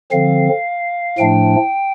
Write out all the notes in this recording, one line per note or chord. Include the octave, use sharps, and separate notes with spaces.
D3 F3 C4 F5
A2 F3 A3 D4 G5